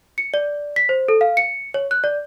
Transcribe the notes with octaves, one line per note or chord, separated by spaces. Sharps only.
C#7
D5
B6
C5
A4
F5
C#7
C#5
F#6
D5